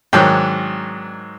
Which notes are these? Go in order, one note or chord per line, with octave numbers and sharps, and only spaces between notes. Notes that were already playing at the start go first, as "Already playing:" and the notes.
G#2 D#3 F#3 C4 D4 G5